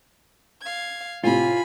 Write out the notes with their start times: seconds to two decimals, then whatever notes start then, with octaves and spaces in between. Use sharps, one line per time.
0.62 F5 G#6
1.24 A2 C3 F4 G#5 B5